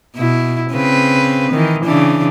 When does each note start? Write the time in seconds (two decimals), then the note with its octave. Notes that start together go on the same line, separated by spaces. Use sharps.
0.17 B2 E4
0.71 C#3 C4 B4
1.52 D#3 E3
1.84 C#3 E3 D4